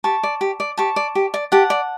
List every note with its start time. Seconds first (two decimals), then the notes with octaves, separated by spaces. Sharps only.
0.04 G4 A5 C#6
0.23 D5
0.41 G4
0.60 D5
0.78 G4 A5 C#6
0.96 D5
1.15 G4
1.34 D5
1.52 G4 F#5 A5
1.70 D5